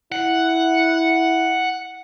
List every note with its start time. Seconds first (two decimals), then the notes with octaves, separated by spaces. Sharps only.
0.12 E4 F#5